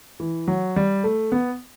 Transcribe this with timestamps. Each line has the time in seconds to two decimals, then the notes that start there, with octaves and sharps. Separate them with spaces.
0.20 E3
0.48 F#3
0.76 G3
1.04 A3
1.32 B3